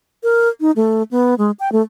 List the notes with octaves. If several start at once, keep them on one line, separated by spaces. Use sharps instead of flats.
A#4
D#4
A3
B3
G#3
G5
A3